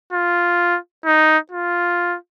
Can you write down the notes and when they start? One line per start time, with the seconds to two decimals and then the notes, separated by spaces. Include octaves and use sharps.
0.13 F4
1.06 D#4
1.52 F4